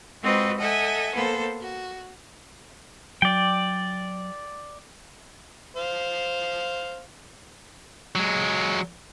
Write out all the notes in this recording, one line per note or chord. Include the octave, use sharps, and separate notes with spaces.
G#3 C4 F4 F#4 B4 D#5
A4 D#5 E5 F#5 G#5
A#3 B3 A4 C5
F#4
F#3 D5 G5
C5 F5
F#3 G#3